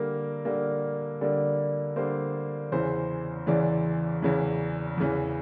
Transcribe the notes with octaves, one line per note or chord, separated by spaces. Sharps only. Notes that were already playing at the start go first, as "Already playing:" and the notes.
Already playing: D3 G3 A#3 A#4
D3 G3 A#3
D3 G3 A#3
D3 G3 A#3 C5
E2 C#3 E3 C5
E2 C#3 E3 D5
E2 C#3 E3
E2 C#3 E3